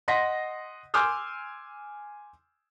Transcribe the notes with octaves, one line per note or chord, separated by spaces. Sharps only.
D#5 F#5 C6 A#6 B6
G#5 C6 D6 E6 F6 G6